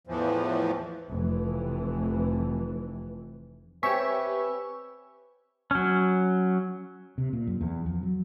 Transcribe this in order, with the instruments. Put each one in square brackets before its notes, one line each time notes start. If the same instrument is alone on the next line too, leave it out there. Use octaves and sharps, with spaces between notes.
[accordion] E2 A2 E3 F3
[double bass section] F1 F2 E3
[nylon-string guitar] C4 [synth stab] G4 C#5 E5 [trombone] B4 [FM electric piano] G#5 C#6 E6
[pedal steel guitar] F#3 C#4
[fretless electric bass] C3
A#2
F#2
E2
F2
F#3